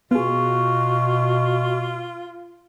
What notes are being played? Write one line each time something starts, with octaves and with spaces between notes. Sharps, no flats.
B2 B3 F4 F#4 G#4